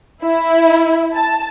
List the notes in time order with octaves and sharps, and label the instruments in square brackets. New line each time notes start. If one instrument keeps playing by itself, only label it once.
[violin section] E4
A5